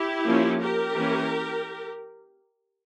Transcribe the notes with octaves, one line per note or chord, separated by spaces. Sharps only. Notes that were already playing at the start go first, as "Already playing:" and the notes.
Already playing: E4 G4
F3 A#3 C#4
G4 A#4
E3 A#3 C#4